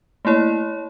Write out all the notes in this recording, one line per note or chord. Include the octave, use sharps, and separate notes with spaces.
A3 A#3 E4 C#5